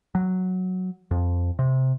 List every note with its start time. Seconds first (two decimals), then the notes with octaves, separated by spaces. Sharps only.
0.15 F#3
1.11 F2
1.59 C3